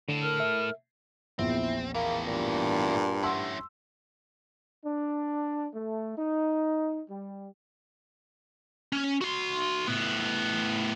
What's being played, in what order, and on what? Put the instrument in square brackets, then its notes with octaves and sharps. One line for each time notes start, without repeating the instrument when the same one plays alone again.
[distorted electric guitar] A2 A4 [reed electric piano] D3
[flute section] A#4 F6
[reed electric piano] E5
[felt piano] A#1 E2 [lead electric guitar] C4 [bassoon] E4
[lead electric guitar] A2 E3 [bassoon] A#3
[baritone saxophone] G2 [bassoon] A#2
[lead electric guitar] C#4 E4 [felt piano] F#5 C6 E6
[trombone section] D4
A3
D#4
G3
[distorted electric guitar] C#4
F#4 C6
A2 B3